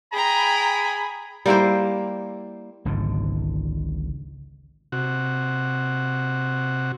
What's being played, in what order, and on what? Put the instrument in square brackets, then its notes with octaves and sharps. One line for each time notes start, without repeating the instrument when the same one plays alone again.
[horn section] G#4 G#5 B5 [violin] G5 A#5
[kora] G3 A#3 E4 C5
[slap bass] G#1 C#2 G#2 D3
[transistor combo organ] C3 F#4